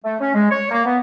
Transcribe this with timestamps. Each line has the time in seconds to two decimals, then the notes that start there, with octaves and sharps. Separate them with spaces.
0.04 A3
0.21 C#4
0.34 G#3
0.51 C#5
0.71 A#3
0.86 B3